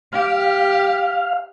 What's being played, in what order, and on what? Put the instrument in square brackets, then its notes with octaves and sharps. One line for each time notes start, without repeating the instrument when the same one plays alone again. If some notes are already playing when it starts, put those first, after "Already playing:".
[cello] G4 [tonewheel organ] F5